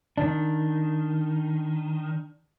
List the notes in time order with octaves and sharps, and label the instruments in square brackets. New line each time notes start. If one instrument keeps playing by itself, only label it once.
[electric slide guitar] D#3 D4